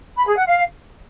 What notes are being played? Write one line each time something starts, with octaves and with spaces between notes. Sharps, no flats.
B5
G#4
F#5
F5